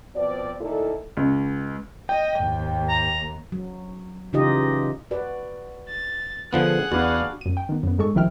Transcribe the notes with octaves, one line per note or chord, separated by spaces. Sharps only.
B2 F3 C4 D5
D2 A#2 D#4 E4 A4
C#2
D#5 G5
D#2 G#2
A#5
F#3
C#3 E3 D#4 F4 G4 D#5
F#4 B4 D5
A6
D3 F3 B3 G#4 F#5
E2 D4 F#4 B4 D5 F5
F#2 D#7
G5
D#3 B3
F#2 B3
G#2 G#3 A4 C#6
C2 D#3 F3 E4 G5 F6